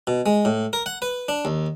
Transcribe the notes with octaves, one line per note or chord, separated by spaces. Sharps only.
B2
G#3
A2
A#4
F#5
B4
D4
D#2